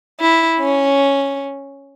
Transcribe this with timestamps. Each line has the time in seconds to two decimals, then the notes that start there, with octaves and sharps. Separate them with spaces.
0.20 E4
0.59 C#4